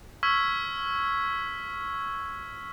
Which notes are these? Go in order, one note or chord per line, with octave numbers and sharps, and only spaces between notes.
C#6 E6 F6 G#6 B6